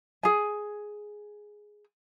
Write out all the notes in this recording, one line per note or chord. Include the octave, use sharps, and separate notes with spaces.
G#4 G#5